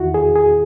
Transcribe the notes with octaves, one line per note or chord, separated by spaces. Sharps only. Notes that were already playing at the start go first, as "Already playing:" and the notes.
Already playing: E2 D#3 E4 F#4
G#4
G#4